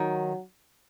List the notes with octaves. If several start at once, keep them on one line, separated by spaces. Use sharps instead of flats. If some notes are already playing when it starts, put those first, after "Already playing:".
Already playing: D#3 F#3